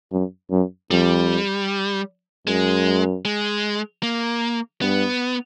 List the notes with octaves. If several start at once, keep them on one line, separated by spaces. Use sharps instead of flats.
F#2
F#2
F2 G3
F#2 G#3
G#3
A#3
G2 B3